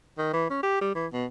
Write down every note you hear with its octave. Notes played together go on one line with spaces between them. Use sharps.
D#3
E3
C#4
G4
G3
E3
B2